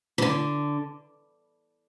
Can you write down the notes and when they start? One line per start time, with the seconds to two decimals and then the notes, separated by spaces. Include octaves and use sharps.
0.18 E3
0.22 D3